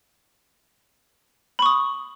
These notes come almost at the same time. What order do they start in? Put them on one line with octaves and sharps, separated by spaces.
B5 C#6 D#6